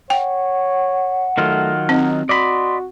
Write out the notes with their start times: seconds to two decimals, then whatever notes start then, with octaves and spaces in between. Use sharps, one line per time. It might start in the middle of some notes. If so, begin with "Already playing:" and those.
0.10 C#5 F#5 G5
1.38 D#3 F#3 A3 F4
1.89 C4 D#4
2.29 F#4 D5 D#5 B5 C6